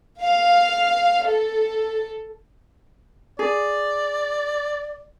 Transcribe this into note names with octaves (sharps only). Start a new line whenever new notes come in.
F5
A4
G#4 D5